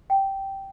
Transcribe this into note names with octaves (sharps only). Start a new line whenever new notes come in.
G5